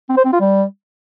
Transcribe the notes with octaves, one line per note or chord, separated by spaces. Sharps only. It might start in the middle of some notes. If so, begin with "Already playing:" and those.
C4
C5
C4
F4
G3